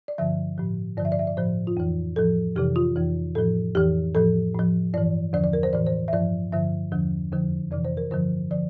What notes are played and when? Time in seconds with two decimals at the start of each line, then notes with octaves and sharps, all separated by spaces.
0.08 D5
0.18 G2 D3 F3 E5
0.58 A2 F3
0.97 G2 D3 F3 D5
1.05 E5
1.12 D5
1.19 E5
1.27 D5
1.37 A2 F3 C5
1.67 F4
1.77 F2 E3
2.16 A2 F3 A4
2.56 F2 C3 E3 G4
2.76 F4
2.96 F2 E3
3.35 A2 F3 A4
3.75 F2 E3 G4
4.15 A2 F3 A4
4.55 A2 F3
4.94 G2 E3 D5
5.33 E2 D3 F3 D5
5.44 D5
5.53 A#4
5.63 C5
5.73 A2 E3 D5
5.87 C5
6.08 E5
6.13 G2 F3 D5
6.52 G2 D3 F3 E5
6.92 E2 D3 F3
7.32 F2 D3 F3
7.72 F2 C3 E3 D5
7.85 C5
7.97 A#4
8.11 G2 D3 F3 C5
8.51 D3 F3 D5